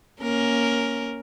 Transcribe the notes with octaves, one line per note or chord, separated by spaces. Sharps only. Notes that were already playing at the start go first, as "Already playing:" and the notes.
A#3 C#4 A#4